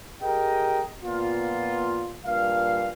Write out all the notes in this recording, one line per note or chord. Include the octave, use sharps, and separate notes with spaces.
G4 G#4 A#4 D#5 G5
A#2 B3 F4
G2 A#2 F5